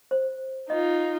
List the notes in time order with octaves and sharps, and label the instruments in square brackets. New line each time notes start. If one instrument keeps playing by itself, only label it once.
[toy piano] C5
[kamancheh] D#4 F4 [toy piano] D#5